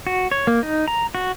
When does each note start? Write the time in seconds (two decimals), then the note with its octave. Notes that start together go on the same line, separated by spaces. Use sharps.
0.07 F#4
0.31 C#5
0.47 A#3
0.63 D#4
0.88 A#5
1.15 F#4